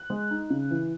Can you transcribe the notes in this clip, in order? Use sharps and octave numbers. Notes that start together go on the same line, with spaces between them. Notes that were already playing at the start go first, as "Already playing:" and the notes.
Already playing: F#6
G#3
D#4
C#3
E3